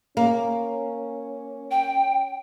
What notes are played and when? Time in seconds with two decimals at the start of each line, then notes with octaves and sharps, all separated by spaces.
0.17 A#3 C#4
1.71 G5